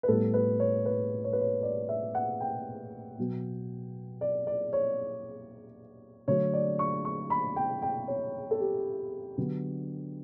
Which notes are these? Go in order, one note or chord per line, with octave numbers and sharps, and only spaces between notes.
B4
A2 G3 B3 A4
B4
C#5
B4
C#5
B4
C#5
D5
E5
F#5
G5
B2 F#3 B3
D5
D5
C#5
D3 F#3 A3 C#5
D5
C#6
C#6
B5
G5
G5
C#5
A4
G4
D3 F#3 B3